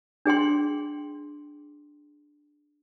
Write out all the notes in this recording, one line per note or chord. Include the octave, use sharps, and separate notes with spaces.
D4 G#4 G5 C6